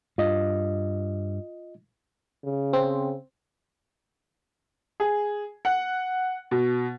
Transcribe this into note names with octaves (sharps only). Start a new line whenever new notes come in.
G2 F4 D#5
C#3
C4
G#4
F#5
B2